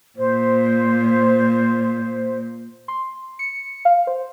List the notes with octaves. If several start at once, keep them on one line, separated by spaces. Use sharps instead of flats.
A#2 C5
C6
C#7
F5
C5